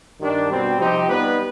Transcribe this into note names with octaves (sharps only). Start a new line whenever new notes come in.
G2 D#3 G3 D4
B2 G3 C4
C3 F3 C4 D#4 G4
G3 B3 D#4 B4